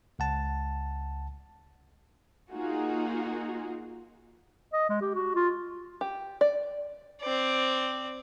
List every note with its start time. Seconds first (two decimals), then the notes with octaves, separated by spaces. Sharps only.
0.19 C#2 F#5 A5
2.51 A#3 D#4 F4 F#4 G#4
4.73 D#5
4.89 G#3
5.01 G4
5.14 F#4
5.35 F4
6.01 G4
6.41 D5
7.22 C4 D5